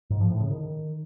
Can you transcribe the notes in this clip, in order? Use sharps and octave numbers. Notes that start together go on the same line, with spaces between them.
G#2
F3
A2
C#3
D#3